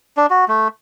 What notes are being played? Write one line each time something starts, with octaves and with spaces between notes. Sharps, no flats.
D4
F#4
A3